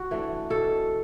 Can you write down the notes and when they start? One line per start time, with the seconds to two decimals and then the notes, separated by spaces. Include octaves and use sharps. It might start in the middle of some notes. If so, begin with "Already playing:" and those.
Already playing: F#4
0.11 E3 A3 D4
0.50 B2 A4